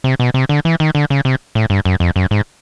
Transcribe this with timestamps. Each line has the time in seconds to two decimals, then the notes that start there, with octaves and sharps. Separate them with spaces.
0.04 C3
0.20 B2
0.34 C3
0.49 D3
0.65 E3
0.80 D#3
0.95 D3
1.10 C#3
1.25 C3
1.55 A2
1.70 G2
1.85 F#2
2.00 F2
2.16 F#2
2.31 G#2